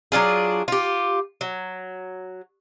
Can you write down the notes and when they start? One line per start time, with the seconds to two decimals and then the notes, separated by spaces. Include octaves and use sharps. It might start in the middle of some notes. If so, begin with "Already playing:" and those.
0.12 F#3 D4 F4 G#4
0.68 F4 G4
1.41 F#3